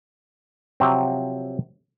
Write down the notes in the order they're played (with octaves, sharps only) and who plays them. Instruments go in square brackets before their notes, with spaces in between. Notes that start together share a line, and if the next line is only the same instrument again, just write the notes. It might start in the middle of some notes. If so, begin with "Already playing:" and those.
[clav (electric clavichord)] C3 F3 F#3 C4